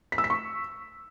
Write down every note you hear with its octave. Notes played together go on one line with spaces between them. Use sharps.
B6
E6
B6
C#6